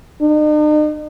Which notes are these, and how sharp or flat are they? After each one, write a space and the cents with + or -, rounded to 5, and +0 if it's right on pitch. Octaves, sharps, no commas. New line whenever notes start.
D#4 -45